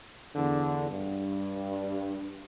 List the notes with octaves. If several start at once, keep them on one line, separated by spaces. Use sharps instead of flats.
E2 D3
G2